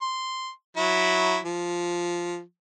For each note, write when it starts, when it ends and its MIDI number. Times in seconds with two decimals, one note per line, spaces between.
0.02 0.50 84
0.77 1.38 54
0.77 1.38 64
1.45 2.41 53